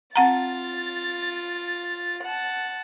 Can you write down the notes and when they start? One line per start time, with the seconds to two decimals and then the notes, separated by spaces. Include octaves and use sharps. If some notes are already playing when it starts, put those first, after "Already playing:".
0.16 C4 F4 F#5 A#5 A6
2.23 F#5 A5